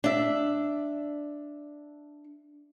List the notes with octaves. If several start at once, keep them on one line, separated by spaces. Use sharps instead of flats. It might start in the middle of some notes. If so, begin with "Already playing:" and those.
D4 E5